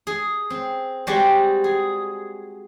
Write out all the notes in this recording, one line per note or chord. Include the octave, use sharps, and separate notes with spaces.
G#4
C4
G3 G#3 C4 F#4 G4
G#4